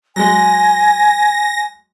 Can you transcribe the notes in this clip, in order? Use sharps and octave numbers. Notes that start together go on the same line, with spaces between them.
F#3 G#3 G#5 A#6